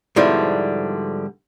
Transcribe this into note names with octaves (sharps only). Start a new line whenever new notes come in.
G#2 B2 D3 F3 G3 E4